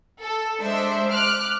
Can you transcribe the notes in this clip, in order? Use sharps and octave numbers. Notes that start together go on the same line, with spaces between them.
A4
G#3 D4 C5 E5
D6 F6 F#6